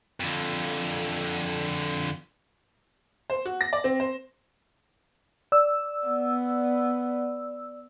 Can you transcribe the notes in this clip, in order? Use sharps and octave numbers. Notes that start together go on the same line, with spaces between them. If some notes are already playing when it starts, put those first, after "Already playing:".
F2 D3
C5
F#4
A#6
D5
C4
C5
D5 E6
B3